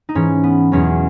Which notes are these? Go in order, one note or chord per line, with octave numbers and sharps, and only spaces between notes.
D#4
G#2 E3 C#4
B3
E2 B2 F#3 C#4